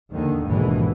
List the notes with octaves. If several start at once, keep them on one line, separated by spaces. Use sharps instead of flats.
D#2 D3 D#3
G#1 D#2 G#2 B2 D3 E3